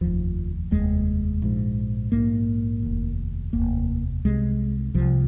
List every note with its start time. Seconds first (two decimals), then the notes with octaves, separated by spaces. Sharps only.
0.01 F1 D#2 F3
0.71 F1 D#2 G#3
1.42 A#1 G#2
2.12 A#1 G#2 A#3
2.83 F1 D#2
3.53 F1 D#2 A#3
4.25 C2 C3 G#3
4.94 C2 C3 F3